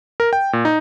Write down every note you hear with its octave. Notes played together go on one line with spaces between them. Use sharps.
A#4
G5
A#2
D#4